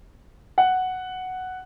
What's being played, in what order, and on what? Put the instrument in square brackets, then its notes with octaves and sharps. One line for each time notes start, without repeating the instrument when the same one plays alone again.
[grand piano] F#5